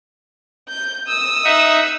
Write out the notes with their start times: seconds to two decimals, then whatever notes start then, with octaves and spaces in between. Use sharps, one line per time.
0.69 G6
1.07 D#6 E6
1.45 D#4 E5 F#5